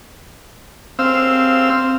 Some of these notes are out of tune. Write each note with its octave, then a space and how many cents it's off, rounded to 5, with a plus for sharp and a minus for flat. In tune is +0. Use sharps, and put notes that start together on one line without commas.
C4 +0 F5 -10 E6 +0